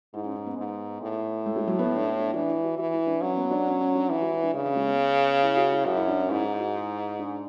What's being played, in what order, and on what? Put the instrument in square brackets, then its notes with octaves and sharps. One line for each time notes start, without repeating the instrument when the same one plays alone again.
[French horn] G#2 [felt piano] E4
[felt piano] C#4
C#4
B3
[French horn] G#2
A2
[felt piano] A3
G#3
F#3
B3
D4
E4
D4
[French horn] E3 [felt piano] D4
[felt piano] E4
F#4
[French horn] E3 [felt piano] F#4
[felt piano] E4
D4
[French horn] F#3 [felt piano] C#4
[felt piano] B3
D4
C#4
C#4
D4
[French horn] E3 [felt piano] E4
[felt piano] F#4
E4
D4
[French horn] C#3 [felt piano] D4
[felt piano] C#4
G#3
B3
E4
F#4
E4
[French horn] F#2 [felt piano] F#4
[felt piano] E4
D4
C#4
[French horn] G#2 [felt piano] E4
[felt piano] E4
F#4
E4
D4